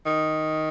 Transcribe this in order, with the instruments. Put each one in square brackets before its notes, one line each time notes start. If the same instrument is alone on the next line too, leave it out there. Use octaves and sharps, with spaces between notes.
[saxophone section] D#3